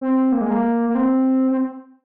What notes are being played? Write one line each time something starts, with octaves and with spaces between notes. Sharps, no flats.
C4
A#3
G#3
A#3
A#3
C4
C4